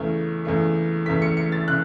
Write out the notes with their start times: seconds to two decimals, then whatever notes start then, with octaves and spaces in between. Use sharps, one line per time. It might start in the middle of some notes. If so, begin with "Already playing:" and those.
Already playing: E2 C#3 A3
0.45 E2 C#3 A3
1.06 E2 C#3 A3 B6
1.22 C#7
1.37 C#7
1.52 A6
1.68 C#3 F#6